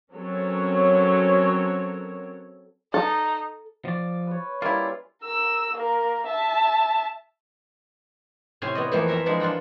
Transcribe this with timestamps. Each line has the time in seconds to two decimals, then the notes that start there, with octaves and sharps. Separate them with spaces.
0.13 F#3 C4 C#4 A4 A#4 C#5
2.94 D#4 A4
3.85 F3 D5
4.27 B4 C#5
4.62 G3 A#3 C#4 E4 F4
5.23 A#4 E6
5.73 A#3 A#4
6.26 E5 A5
8.62 A2 C3 C4 C#4 G#5 C6
8.75 B3 D5 D#5
8.92 F2 E3 F3 A3 A#3 F4
9.08 C4 A4 A#4 E5 A#5
9.26 E3 F3 G#3 D4
9.40 D4 F4 D5 F#5 G5